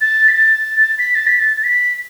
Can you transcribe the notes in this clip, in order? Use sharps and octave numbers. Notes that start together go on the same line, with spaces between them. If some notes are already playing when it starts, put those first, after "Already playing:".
A6
B6
A6
B6
A6
B6
A6
A6
B6